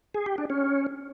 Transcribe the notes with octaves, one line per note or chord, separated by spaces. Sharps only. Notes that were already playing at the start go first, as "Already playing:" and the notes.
G#4
G4
D4
C#4